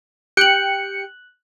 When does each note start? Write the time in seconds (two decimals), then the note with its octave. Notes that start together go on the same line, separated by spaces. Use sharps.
0.37 G4 G5 F#6 C#7 F#7